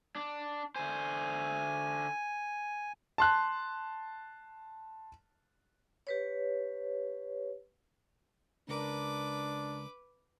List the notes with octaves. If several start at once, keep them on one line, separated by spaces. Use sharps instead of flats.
D4
D3 C5 G#5
A5 C6 F#6
G4 B4 C#5
C#2 D4 A#4 B4 D6